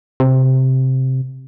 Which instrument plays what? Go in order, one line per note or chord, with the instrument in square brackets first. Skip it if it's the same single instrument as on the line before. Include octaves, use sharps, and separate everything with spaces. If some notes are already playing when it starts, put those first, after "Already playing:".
[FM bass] C3